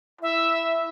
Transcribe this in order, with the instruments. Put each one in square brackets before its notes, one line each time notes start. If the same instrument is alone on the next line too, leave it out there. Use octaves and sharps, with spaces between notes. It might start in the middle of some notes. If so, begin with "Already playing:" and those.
[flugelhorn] E4 [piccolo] E5